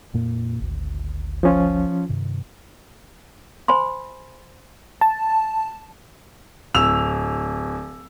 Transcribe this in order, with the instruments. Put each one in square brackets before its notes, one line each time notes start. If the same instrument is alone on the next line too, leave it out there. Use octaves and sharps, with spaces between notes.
[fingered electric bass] F2 A#2 A#3
G#1 D2
[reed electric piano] F3 C#4 F4
[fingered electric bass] G2 C3 D#3
[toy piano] C5 G#5 B5 C6
[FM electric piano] A5
[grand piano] D1 E6 F7